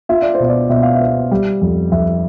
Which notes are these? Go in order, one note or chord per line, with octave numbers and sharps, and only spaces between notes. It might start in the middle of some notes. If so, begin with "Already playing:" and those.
F4 E5
D5
C5
B2
D5
B2 E5
F5
E5
B3
G3
F2
F2 E5